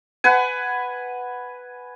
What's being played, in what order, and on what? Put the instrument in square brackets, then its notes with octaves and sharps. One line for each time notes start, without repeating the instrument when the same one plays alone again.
[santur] B4 F#5 G#5